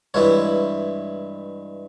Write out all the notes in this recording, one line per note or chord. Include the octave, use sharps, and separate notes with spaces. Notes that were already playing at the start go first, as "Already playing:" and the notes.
G2 E3 G#3 E4 C#5